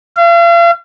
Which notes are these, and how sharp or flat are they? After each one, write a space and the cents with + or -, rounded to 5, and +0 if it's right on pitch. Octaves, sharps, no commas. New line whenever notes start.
F5 -40